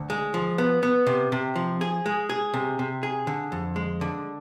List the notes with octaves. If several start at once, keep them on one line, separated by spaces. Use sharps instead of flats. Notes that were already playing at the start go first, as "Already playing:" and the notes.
Already playing: D2
G#3
F3
B3
B3
C3
C3
F3
G#4
G#3
G#4
C3
C3
G#4
D3
F2
G#3
D3